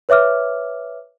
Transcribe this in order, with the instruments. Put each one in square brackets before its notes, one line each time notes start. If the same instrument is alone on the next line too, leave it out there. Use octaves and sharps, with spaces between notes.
[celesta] B4 C#5 E5 D6 F6